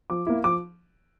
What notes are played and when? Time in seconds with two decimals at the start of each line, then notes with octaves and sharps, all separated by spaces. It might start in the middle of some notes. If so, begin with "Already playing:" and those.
0.10 F3 D6
0.27 A#3 E4
0.44 F3 D6